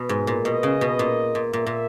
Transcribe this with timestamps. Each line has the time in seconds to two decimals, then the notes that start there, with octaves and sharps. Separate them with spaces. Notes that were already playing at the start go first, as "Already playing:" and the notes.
Already playing: B2 B4
0.09 G#2
0.27 A#2
0.45 B2 D#5
0.63 C#3
0.81 B2
0.99 A#2
1.35 A#2
1.53 A#2 E5
1.66 A#2